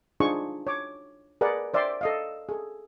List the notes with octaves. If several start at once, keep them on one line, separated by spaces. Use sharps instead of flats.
D4 D#4 F4 G#4 C5 C#6
C#5 D6
G#4 A#4 B4 D5 F#5
C5 D5 E5 G5 C6
A4 D#5 F5
G#4 A4